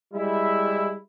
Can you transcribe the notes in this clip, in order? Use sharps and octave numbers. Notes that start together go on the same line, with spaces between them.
G3 G#3 E4